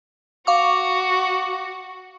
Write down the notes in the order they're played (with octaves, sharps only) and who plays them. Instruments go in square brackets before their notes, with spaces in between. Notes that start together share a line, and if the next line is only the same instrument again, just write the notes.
[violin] F#4 [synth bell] F5 C#6 D6